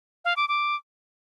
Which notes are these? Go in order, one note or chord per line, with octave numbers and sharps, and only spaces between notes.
F5
D6
D6